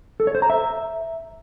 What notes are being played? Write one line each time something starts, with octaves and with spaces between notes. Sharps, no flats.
A4
C#5
C5
A#5
E5